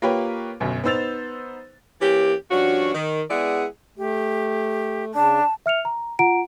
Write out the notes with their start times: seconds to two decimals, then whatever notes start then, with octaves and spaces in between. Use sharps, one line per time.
0.02 A#3 F4 G4 B4 C#5
0.60 G1 F#2 B2
0.84 B3 D#4 C5 E6 A6 F7
2.02 E3 A#3 C#4 G4
2.51 G2 F3 C#4 D4 F#4
2.94 D#3
3.30 G#3 B3 E4 G#4 D5 F#5
3.98 A3 G4
5.14 C#3 D4 A5
5.66 E5 F6 C#7 F7
5.85 A#5
6.19 F4 F#5 A#5 D7